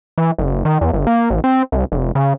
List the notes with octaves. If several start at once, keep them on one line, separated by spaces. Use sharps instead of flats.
E3
F#1
D#3
E2
G1
A#3
A1
C4
C2
F1
C#3